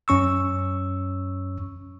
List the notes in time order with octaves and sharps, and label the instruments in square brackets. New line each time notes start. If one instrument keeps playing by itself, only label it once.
[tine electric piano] F#2 C#4 C#6 E6